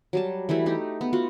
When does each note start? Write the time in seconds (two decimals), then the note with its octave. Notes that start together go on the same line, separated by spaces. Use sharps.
0.13 F#3 G3 A5
0.49 E3 G3 A3 E4
0.66 A3 D#4 G4
1.01 B3
1.13 F4 F#4